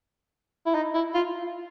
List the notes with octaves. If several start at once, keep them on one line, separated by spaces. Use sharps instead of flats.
E4
D#4
E4
F4